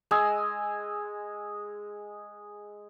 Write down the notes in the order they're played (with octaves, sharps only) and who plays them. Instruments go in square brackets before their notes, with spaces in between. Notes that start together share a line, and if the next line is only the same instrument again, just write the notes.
[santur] G#3 D#5 G#5 E6